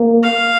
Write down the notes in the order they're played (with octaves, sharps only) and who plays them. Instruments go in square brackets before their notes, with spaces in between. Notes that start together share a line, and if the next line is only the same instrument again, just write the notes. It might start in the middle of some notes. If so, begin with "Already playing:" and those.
Already playing: [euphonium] A#3
[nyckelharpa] F5